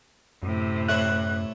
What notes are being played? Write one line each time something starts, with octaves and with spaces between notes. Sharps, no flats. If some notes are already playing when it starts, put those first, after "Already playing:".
F#2 A2 C3
A3 E4 C#5 F#6